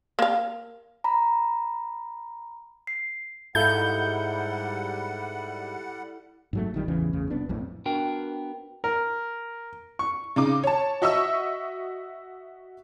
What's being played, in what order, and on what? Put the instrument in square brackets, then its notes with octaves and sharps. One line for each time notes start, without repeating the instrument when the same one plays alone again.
[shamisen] A#3 F5
[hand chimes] A#5 B5
C7
[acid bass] G#2 [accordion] G3 F#5 [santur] E4 A4 F5 [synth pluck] G6
[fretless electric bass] G#2 F#3 A3
A#1 D#3 G3
A1 E2 C#3 E3
A1 E2 C#3
F1 C2 B3 D4
A#1 F2 A2
[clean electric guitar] B3 D4 F#4 A#4 G5
[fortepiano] A#4
C#6
[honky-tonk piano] C#3 D#4 D6
C#5 A5
F#4 D#5 E5 C#6 D#6 E6